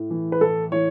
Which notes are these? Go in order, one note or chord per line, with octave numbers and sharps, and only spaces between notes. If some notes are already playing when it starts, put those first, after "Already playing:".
Already playing: A2
E3
B4
A2 A4
E3 C#5